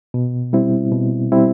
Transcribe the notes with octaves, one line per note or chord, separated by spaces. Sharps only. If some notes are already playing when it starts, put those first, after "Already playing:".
B2
G3 C4 E4
B2
G3 C4 E4